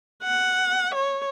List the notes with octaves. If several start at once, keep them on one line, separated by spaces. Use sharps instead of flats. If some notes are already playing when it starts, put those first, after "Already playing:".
F#5
C#5